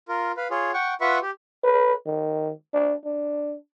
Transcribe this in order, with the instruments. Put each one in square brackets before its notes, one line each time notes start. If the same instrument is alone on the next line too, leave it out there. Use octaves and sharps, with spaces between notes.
[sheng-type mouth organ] F4 A#4
B4 F5
F4 G#4 C#5
F#5 G5 C#6
F4 B4 E5 F#5 B5 C#6
G4
[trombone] B4
D#3
D4
D4